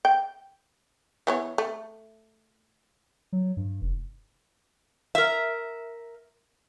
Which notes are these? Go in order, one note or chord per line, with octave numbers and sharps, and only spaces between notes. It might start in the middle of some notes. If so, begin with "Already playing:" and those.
G5
E3 B3 C#5
A3
F#3
G2
F1
A#4 E5